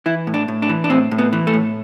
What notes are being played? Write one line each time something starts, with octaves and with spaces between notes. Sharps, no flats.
E3 E4
A2
D4
A2
D4
E3
D4
A2 C4
A2
B3
E3
A3
A2